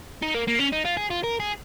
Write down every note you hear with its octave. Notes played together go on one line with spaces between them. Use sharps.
D#4
A#3
A#3
C#4
D#4
F4
G#4
F4
A#4
G#4